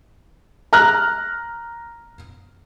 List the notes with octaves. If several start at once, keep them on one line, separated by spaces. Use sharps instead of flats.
A#5 F6 F#6